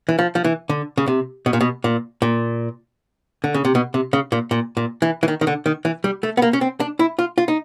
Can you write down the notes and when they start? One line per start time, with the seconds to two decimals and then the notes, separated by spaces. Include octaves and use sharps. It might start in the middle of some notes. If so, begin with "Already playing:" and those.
0.09 E3
0.19 F3
0.35 F3
0.44 E3
0.69 D3
0.97 C#3
1.08 C3
1.46 B2
1.53 A#2
1.61 B2
1.84 A#2
2.22 A#2
3.44 D3
3.54 C#3
3.65 C3
3.75 B2
3.94 C3
4.13 C#3
4.32 A#2
4.51 A#2
4.77 A#2
5.02 E3
5.23 E3
5.28 D#3
5.41 D#3
5.47 D3
5.66 D#3
5.85 E3
6.04 G3
6.23 A3
6.37 B3
6.42 A#3
6.53 C#4
6.61 C4
6.80 D4
6.99 E4
7.19 F4
7.38 F4
7.48 D#4